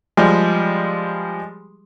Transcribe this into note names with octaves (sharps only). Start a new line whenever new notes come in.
F3 G3 G#3